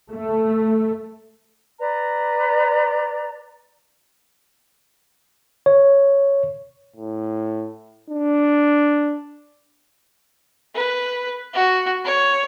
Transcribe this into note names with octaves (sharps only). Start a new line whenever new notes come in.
A3
B4 D5 A#5
C#5
A2
D4
B4
F#4
C#5